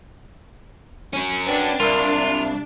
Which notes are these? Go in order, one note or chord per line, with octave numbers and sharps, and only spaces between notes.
C#4 F#4
D4 B4 G5
C2 F4 A#4 E6
E5 F5